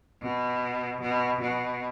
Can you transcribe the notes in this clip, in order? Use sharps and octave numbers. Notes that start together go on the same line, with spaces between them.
B2
B2
B2